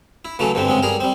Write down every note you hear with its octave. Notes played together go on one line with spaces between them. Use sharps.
E4
C#3 E3 F#3 A3 A4
G2 D3 E3 C4
C#3 G#3 C4
G3 G#4 A#4
G3 C4